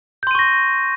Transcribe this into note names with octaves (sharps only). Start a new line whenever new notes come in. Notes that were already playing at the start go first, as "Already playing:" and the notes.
C6 C#6 G6 A#6 D#7